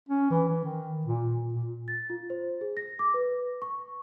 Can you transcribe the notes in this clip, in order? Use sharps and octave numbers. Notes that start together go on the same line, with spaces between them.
C#4
E3
E3
D#3
A#2
A#2
A6
F4
C5
G#4
A#6
D6
B4
C#6